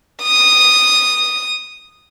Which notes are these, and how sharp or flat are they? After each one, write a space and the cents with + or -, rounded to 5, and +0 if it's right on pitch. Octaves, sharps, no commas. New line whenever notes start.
D#6 -10